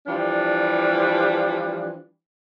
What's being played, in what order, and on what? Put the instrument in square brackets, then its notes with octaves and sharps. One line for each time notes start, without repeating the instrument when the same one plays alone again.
[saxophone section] E3 F3 G3 D4 G4